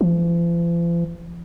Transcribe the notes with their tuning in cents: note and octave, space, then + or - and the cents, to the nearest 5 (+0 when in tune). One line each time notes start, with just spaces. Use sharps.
F3 -45